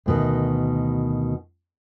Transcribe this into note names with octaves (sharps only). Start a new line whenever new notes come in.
D2 B2 D#3